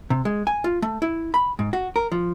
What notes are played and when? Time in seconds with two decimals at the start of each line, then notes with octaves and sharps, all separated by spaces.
0.10 C3
0.25 G#3
0.47 G#5
0.64 F4
0.82 A3
1.02 E4
1.34 B5
1.59 G#2
1.73 F#4
1.96 A#4
2.12 F3